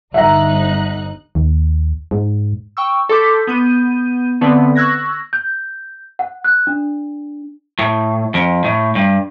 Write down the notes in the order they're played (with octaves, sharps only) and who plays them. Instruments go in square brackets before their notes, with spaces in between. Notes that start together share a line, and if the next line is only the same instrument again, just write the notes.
[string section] G1 D#4 F#6 [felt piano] E5 F#5 A#5
[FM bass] D#2
G#2
[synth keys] G5 C#6 E6
A4 C6 D6 G6 B6
B3 G6 D#7
D3 A3 B3 C4 B4
C#6 E6 F#6 G#6 A#6
[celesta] G6
F#5
F#6
D4
[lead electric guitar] A2
F2
A2
G2